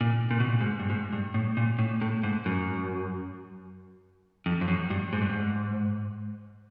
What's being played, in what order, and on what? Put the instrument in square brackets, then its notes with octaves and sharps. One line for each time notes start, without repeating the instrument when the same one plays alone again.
[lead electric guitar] A#2
A#2
B2
A#2
G#2
G2
G#2
G2
A2
A#2
A2
A2
G#2
F#2
F2
F2
F#2
G2
G#2
G2
G#2